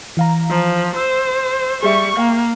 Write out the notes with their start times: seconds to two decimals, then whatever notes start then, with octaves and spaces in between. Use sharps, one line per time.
0.17 E3 F5 A#5
0.49 F3
0.96 C5 E6
1.83 G3 G#4 E5 C#6
2.17 A#3 F5 G5